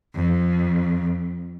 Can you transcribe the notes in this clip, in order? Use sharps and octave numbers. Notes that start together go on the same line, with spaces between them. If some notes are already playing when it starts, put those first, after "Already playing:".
F2